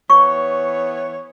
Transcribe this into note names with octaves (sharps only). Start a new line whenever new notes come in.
E3 B3 C#5 C#6